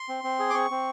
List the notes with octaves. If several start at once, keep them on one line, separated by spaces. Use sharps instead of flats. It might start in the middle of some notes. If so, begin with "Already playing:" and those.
Already playing: C6
C4
C4
G#4
D6
C4 C#6
C4